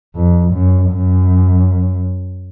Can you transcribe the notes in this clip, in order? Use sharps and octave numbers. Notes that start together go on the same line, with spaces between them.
F2
F#2
F#2